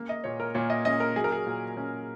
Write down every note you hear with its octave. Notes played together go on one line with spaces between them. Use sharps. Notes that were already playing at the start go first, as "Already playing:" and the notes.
Already playing: A#3 C#4
D#5
A#2 C#5
A#4
A#2 C#5
D#5
C#4 D#5
A#4
F#3 G#4
A#4
G#4
A#2
C#4